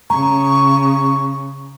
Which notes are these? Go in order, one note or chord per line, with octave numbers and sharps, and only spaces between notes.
C#3 A#5 C#6